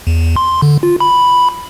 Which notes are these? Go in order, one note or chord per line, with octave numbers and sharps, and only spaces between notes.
E2
C6
D3
F4
B5